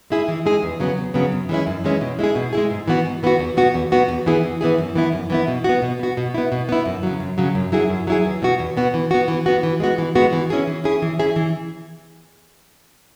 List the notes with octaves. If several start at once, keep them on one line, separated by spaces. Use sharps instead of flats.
G#3 E4 G#4
E3
G#3 E4 G#4
E2
C#3 F#3 B3
E2
C#3 F#3 B3
F#2
E3 G#3 C#4 E4
F#2
E3 G#3 C#4 E4
B2
G#3 E4 G#4
B2
G#3 E4 G#4
G#2
E3 B3 F#4
G#2
E3 B3 F#4
E2
B2 B3 F#4
E2
B2 B3 F#4
E2
E3 B3 E4 G#4
E2
E3 B3 E4 G#4
F#2
E3 B3 E4
F#2
E3 B3 E4
B2
B3 F#4
B2
B3 F#4
B2
B3 E4
B2
B3 E4
F#2
C#3 F#3
F#2
C#3 F#3
F#2
F#3 E4 G#4
F#2
F#3 E4 G#4
E2
B2 B3 F#4
E2
B2 B3 F#4
E3
B3 F#4
E3
B3 F#4
E3
G#3 B3 F#4
E3
G#3 B3 F#4
E3
C#4 E4 G#4
E3
C#4 E4 G#4
E3
C#4 E4 G#4
E3